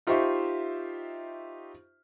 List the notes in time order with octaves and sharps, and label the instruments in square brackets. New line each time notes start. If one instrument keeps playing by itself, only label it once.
[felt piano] D#4 F4 G4 C5 E5 C#6